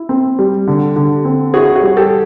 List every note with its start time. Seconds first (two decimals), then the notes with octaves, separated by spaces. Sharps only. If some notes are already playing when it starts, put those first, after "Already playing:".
Already playing: E4
0.09 C4
0.39 G3
0.67 D3
0.96 D3
1.25 C4
1.54 E4 F#4 G#4
1.75 F#4 G#4
1.83 G3
1.97 G4 A4